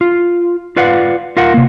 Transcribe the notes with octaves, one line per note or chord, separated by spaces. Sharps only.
F4
F4 B4 D5 F5 F#5
F4 A#4 F5 F#5
C3 A#3